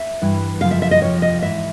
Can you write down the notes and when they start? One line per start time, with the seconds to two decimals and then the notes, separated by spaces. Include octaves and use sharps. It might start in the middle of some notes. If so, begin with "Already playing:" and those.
Already playing: E5
0.22 G2 E3
0.61 F#2 C#3 F3 F5
0.71 E5
0.82 E5
0.91 D#5
1.01 F2 C3 F3 C#5
1.22 D#5
1.42 G#2 E3 E5